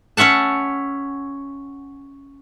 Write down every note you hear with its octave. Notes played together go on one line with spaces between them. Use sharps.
C#4 C#5 E5 F#5 A5